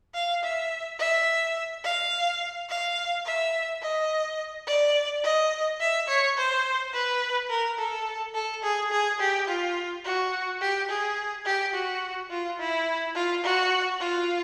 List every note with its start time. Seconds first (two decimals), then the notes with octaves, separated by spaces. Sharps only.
0.14 F5
0.43 E5
0.99 E5
1.84 F5
2.69 F5
3.25 E5
3.82 D#5
4.67 D5
5.24 D#5
5.80 E5
6.08 C#5
6.37 C5
6.93 B4
7.50 A#4
7.78 A4
8.34 A4
8.63 G#4
8.92 G#4
9.20 G4
9.48 F4
10.04 F#4
10.61 G4
10.89 G#4
11.45 G4
11.74 F#4
12.30 F4
12.59 E4
13.15 F4
13.43 F#4
14.00 F4